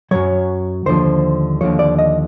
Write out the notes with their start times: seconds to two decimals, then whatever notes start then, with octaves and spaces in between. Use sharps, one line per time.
0.11 F#2 C#3 F#3 C#5
0.86 D#2 D3 F3 C5
1.61 D#2 D3 F3 C#5
1.79 D5
1.99 D#5